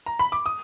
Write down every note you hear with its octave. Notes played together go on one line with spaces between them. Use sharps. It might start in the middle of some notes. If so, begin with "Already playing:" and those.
A#5
B5
D6
D#6